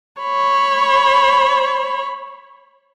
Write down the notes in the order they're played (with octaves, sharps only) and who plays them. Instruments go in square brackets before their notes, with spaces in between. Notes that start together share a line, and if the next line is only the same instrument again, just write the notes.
[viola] C#5 B5